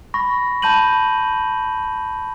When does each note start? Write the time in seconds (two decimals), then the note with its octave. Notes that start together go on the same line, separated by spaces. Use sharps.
0.14 B5 C#6 A#6
0.62 A5 B5 G6 D#7 F#7